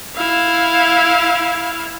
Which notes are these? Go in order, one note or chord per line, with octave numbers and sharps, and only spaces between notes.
E4 F5